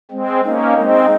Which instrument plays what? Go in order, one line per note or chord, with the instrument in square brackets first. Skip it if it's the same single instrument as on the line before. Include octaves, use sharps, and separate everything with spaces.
[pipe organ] G#3 C4
[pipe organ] A#3 C#4 [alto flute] D#4
[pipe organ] G#3 C4